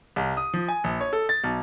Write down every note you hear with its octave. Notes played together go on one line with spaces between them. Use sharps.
C2
D#6
F3
G#5
A#1
C#5
A4
A6
B1